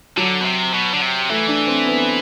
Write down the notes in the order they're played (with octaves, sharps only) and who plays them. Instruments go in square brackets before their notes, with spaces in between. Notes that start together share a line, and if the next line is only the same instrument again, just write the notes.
[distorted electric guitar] D3 [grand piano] F#3
[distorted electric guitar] B2
C3
B2
D3
C3
[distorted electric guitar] E3 [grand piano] A3
[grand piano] D4
C4
B3